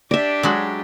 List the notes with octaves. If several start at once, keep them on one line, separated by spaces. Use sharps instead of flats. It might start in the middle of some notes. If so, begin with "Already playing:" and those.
D4 G4 D5 E5
F#3 G#3 F#4